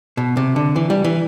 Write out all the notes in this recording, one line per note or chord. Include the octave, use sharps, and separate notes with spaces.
B2
C3
D3
E3
G3
E3